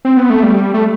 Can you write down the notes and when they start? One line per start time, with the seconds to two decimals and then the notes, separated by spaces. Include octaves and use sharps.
0.05 C4
0.17 B3
0.30 A3
0.43 G3
0.74 A3